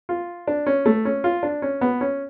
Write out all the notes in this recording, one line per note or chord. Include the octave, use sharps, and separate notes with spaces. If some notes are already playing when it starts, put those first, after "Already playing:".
F4
D4
C#4
A3
C#4
F4
D4
C#4
B3
C#4